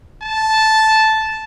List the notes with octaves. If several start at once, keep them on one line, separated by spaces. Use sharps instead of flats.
A5